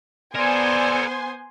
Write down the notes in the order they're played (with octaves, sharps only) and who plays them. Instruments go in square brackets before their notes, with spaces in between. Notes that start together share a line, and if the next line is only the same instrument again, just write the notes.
[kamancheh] B3 C5 [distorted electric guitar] A4 A#4 [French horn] D5 [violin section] G#5 C6